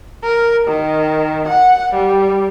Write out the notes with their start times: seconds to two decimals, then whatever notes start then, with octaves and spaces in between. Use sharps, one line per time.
0.24 A#4
0.68 D#3
1.48 F#5
1.94 G3